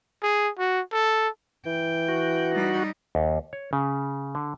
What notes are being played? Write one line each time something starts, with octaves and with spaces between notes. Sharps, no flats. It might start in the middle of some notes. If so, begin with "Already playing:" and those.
G#4
F#4
A4
E3 G5
F#4
G3 D#4
D#2
C#5
C#3
D3